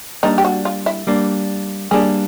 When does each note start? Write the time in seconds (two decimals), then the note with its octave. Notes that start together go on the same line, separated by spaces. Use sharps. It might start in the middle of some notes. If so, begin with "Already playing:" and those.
0.23 G3 A#3 D4 D#4
0.38 G4
0.45 F#4
0.65 F4
0.86 E4
1.07 G3 A#3 D4
1.91 G3 A#3 D4 G#4